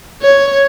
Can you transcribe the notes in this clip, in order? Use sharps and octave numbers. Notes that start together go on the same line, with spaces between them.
C#5